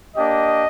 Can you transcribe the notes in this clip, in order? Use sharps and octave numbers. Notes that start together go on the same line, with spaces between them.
A#3 D4 G4 D#5